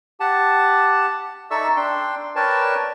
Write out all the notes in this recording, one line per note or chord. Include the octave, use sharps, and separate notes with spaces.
G4 F#5 A5
D#4 A4 D5 E5 C#6 E6
D4 G5 C6
A#4 B4 C#5 D5 G5 A5